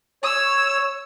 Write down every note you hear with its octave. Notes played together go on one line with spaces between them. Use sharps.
C#5 E6